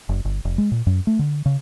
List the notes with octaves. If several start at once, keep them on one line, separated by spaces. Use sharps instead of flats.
F#1
G1
F1
G#3
A#2
F#2
A3
D3
C#3